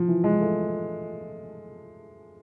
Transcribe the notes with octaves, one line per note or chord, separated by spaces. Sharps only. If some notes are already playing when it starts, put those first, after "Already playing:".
Already playing: F3
E3
G#3
A3